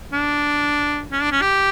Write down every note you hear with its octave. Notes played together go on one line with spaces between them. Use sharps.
D4
C#4
D4
C#4
G4